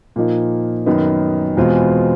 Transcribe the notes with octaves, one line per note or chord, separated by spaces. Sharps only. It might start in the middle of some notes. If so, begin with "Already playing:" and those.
A#2 F3 A#3 D#4
F#2 D#3 F#3 B3 D#4
E2 B2 G#3 C4 F4